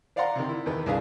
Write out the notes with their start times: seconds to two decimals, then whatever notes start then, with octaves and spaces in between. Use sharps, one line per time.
0.16 C5 D5 F5 F#5 A#5 C6
0.35 C3 D#3
0.49 E4
0.66 E2 D#3 B3
0.86 C2 D4 G#4 B4 F5